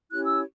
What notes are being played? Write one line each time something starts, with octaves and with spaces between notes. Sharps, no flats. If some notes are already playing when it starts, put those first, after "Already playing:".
C#4 E4 G4 C#5 F#6
E6